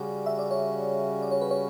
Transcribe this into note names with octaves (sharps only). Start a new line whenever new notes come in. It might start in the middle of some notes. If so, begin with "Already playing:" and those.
Already playing: C#3 G3 C#4 F#4 D5
E5
D5
C#5
D5
C#5
B4
C#5